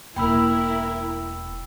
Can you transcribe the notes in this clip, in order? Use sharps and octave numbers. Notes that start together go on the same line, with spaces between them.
E1 A#3 E4 A#4 G5 B5 E6